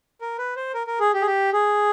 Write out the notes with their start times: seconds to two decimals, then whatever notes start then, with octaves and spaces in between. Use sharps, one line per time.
0.21 A#4
0.38 B4
0.56 C5
0.74 A#4
0.87 A#4
1.00 G#4
1.14 G4
1.22 G#4
1.27 G4
1.53 G#4